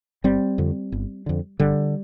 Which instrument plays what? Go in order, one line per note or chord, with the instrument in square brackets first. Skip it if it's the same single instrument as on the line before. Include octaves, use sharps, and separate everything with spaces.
[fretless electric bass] G1 G3 C4
F2 D3
G1
F2 D3
G1 D3 G3